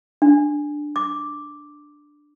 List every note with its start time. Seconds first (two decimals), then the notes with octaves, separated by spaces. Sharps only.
0.22 D4
0.96 D6